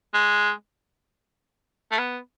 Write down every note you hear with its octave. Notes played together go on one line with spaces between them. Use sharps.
G#3
A3
B3